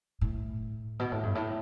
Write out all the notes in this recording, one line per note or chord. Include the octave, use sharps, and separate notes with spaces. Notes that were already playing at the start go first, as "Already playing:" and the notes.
A2
B2
A2
G2
A2